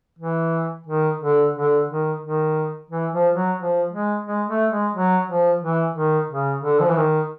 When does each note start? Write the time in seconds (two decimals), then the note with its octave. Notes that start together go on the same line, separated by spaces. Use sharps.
0.19 E3
0.87 D#3
1.21 D3
1.55 D3
1.88 D#3
2.23 D#3
2.90 E3
3.12 F3
3.35 F#3
3.58 F3
3.92 G#3
4.26 G#3
4.48 A3
4.71 G#3
4.94 F#3
5.28 F3
5.61 E3
5.95 D#3
6.30 C#3
6.63 D3
6.80 F3
6.89 E3
6.97 D#3